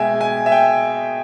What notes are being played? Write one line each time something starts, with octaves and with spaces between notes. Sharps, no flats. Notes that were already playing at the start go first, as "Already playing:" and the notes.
Already playing: B2 G#3 E5 G5 G#5
G#5
E5
G5